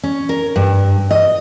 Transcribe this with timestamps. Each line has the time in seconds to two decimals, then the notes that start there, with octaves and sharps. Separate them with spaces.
0.03 C#4
0.29 A#4
0.56 G2
1.11 D#5